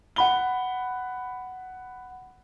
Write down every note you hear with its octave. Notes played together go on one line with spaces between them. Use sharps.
F#5 B5 G7